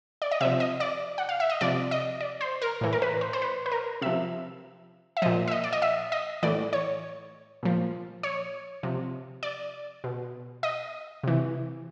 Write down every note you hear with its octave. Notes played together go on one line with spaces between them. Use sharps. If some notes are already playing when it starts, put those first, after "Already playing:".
D5
D#5
C3 F3 E5
D#5
D5
F#5
F5
E5
D#5
C3 F3 D5
D#5
D5
C5
A#4
A2 E3
A#4
B4
C5
C5
B4
B4
A#4
C3 F3 E5
E5
A#2 F3 D#5
E5
D#5
D5
D#5
E5
D#5
A2 E3 D5
C#5
A#2 F3
C#5
C3 F3
D5
B2
D#5
C3 E3